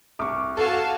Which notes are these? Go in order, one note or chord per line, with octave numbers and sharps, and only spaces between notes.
C2 C#6 D6
F#4 A4 F5 G#5 A5